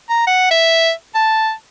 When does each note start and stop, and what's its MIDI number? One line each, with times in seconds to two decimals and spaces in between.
0.10 0.23 82
0.27 0.50 78
0.51 0.91 76
1.15 1.52 81